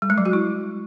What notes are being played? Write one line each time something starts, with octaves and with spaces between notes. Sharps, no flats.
G3
G#3
F#3
F#4
E4